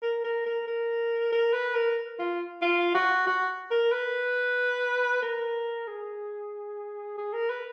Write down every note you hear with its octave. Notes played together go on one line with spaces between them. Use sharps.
A#4
A#4
A#4
A#4
A#4
B4
A#4
F4
F4
F#4
F#4
A#4
B4
A#4
G#4
G#4
A#4
B4